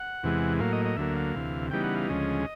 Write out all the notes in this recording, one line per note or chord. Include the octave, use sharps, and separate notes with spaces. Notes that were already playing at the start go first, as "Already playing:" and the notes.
Already playing: F#5
E2 C3 E3 G#3
A2 F#3 A#3 F5
D#5
D#5
D2 D3 F#3 A#3 E5
F5
D2 C3 E3
C#3 E3 G3 B3 D#4 G5
F#5
F5
D2 C#3 F3 G#3 C#4 D#5